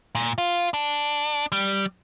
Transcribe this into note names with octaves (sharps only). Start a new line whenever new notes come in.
A#2
F4
D4
G3